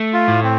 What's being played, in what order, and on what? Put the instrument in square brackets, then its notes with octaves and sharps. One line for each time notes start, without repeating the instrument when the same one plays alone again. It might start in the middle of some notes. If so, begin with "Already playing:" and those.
Already playing: [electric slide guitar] A3
[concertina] F4
[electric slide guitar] A2
[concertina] C4